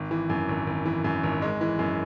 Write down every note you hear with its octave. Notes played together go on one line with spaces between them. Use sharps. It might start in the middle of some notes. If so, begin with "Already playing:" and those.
Already playing: G#1
E3
F#2
G#1
G#1
E3
F#2
G#1
G#3
E3
F#2